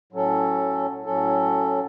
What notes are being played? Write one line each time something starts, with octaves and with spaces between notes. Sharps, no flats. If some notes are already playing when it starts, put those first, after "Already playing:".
A2 F#3 C#4 A4
A2 F#3 C#4 A4